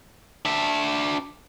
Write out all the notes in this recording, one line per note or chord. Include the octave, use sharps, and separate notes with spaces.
D4 E5